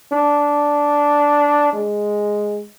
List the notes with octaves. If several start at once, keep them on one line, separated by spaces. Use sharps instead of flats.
D4
G#3